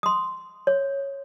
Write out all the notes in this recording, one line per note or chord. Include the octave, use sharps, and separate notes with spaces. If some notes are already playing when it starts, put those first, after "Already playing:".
C6 D#6
C#5